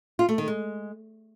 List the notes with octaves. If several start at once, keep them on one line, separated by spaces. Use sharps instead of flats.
F4
A3
D#3
G#3